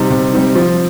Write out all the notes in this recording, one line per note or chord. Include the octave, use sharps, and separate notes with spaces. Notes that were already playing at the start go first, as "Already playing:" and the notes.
Already playing: C3 G3 C4 D#4
C3
G3 C4 D#4
F3